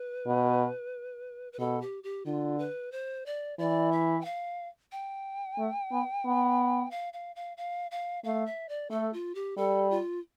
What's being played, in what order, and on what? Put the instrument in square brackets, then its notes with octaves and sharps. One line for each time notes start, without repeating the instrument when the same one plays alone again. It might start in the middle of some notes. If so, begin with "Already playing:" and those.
Already playing: [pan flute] B4
[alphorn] B2
[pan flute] B4
[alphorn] B2 [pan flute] A4
[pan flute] G4
G4
[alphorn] D3 [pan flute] F4
[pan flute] B4
C5
D5
[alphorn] E3 [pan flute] D5
[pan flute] E5
G5
F5
G5
[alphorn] A3
B3
B3
[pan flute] F5
F5
F5
F5
F5
[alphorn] A3 [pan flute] F5
[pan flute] E5
D5
[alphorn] A3 [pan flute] A4
[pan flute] F4
G4
[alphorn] G3 [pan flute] A4
[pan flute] F4